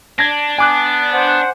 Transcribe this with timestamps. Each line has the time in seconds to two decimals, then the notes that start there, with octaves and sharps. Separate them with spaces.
0.19 D4 G#6 A#6
0.59 B3 G#5 D6 F#6
1.13 C5 F#5